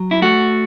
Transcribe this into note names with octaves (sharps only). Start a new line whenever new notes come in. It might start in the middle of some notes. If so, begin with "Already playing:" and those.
Already playing: F#3
E4
A3 F#4